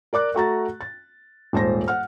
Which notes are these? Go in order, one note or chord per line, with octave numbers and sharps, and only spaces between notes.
A#4 D5 D6 F#6
A3 F#4 A#5 A6
A6
D#1 G#2 C5 A5 A#6
F#5 F6